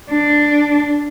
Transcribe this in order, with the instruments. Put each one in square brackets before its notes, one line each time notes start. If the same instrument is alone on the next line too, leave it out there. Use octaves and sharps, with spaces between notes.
[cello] D4